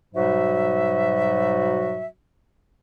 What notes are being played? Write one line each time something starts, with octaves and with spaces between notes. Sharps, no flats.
G#2 B2 F#3 G3 F#4 E5